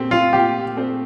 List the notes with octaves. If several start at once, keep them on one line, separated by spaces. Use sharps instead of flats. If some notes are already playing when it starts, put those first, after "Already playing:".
Already playing: A#2 A3 C4 G4 C5
F4
A#2 G4
A3 C4 G4 C5